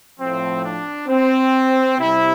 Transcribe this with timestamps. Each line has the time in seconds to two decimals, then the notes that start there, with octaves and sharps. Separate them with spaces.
0.19 A2 F3 C4
0.64 D4
1.09 C4
1.99 C3 G3 E4